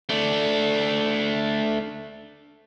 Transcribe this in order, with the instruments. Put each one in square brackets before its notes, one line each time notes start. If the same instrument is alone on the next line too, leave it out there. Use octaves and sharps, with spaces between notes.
[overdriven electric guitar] A3 D4